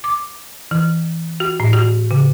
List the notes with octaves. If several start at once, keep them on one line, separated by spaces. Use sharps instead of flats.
D6
E3
F#4
A2
F#4
C#3